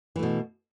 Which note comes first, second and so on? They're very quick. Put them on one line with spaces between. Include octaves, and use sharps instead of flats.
E3 A3 B2